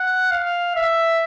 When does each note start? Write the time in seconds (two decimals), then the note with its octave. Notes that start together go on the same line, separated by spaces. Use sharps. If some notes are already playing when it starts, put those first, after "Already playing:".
Already playing: F#5
0.31 F5
0.76 E5